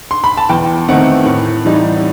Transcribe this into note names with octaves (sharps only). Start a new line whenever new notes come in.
C6
B5
A5
E2 G5
D#3 A3 C4 D#4 F#5
A2
E3 G3 D#4